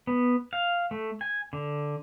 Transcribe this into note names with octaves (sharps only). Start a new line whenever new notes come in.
B3
F5
A3
G#5
D3